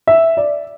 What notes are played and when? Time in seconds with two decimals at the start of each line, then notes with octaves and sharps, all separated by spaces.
0.07 E5
0.37 D5